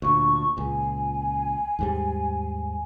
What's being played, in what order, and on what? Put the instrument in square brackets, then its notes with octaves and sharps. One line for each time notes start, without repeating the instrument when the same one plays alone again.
[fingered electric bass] D2 A#2 [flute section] D4 C#6
[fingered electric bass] C#2 A#2 [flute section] G#5
[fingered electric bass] D#2 G#2 G3